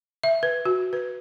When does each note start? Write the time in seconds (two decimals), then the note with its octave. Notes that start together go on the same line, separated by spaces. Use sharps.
0.23 E5
0.43 B4
0.65 F#4
0.93 B4